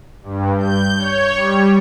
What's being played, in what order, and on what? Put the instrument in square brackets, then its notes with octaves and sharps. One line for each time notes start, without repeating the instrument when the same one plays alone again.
[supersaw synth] G2
G6
C#5
G3